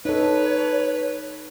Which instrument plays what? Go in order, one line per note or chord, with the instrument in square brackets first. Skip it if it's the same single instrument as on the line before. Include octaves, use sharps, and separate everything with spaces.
[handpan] D#4 A4 [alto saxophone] B4 [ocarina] C#5